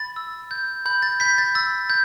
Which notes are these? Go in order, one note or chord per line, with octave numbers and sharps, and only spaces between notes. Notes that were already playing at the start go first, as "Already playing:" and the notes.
Already playing: B5 A6
E6
G6
B5 G6
A6
B5 G6 B6
A6
E6 A6
G6